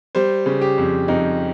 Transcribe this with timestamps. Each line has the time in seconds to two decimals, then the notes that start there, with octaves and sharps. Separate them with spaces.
0.15 G3 C5
0.46 C#3
0.61 G4
0.78 F2
1.08 F2 D#4